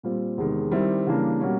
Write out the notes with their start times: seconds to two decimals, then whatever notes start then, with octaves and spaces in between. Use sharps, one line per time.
0.03 A#2 G3 C4 F4
0.37 E2 C3 D#3 G#3
0.71 D#3 G3 C4 E4 G4
1.07 C#3 E3 G3 A#3 D4
1.40 B2 G3 A#3 C#4